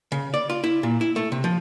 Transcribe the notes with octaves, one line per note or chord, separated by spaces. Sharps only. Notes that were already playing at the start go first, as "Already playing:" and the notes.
C#3
D5
F4
E4
A#2
E4
A3
C3
F3